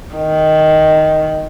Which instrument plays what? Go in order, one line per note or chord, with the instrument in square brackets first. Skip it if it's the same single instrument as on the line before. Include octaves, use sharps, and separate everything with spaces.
[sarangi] D#3